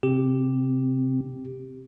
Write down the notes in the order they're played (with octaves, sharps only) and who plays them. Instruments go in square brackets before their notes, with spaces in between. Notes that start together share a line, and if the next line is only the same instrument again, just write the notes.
[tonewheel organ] C3 [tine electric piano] G4